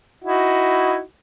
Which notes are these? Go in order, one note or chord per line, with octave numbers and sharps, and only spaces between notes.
D#4 E4 F#4